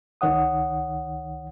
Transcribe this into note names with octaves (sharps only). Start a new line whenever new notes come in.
C#2 D#3 C#5 F#5 D#6